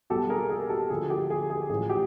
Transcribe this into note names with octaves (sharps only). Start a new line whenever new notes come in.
B1 B2 G3 G4 A4
G#4 A#4
G#4 A#4
G4 A4
D2 D3 F3 G#4
G4 A4
G#4
G#4
A1 A2 F3 G#4
G4